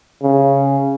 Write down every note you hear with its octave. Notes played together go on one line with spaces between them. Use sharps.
C#3